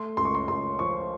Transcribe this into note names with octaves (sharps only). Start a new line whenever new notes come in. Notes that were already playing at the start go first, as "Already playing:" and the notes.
Already playing: A3 C6
C#2 C6
C#6
C6
C#2 C6
F3 C#6